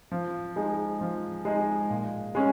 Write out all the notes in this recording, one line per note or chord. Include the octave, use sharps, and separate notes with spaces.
F3
G#3 D#4 G#4
F3
G#3 D#4 G#4
A#2
G#3 C#4